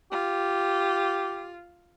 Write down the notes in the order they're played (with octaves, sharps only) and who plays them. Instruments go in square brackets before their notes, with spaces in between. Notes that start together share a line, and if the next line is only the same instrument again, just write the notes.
[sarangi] F4 [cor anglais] G4